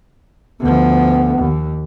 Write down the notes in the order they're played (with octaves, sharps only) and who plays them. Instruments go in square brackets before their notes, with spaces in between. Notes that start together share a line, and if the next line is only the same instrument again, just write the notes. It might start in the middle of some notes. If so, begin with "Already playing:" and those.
[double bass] D2 F3 [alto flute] B3
[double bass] D#2